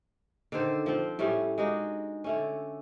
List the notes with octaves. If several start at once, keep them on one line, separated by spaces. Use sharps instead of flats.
D3 D#3 A4 C5
F3 C4
A2 G3 A3 C#4
G#3 D4 D#4 F#4
D3 A3 C#4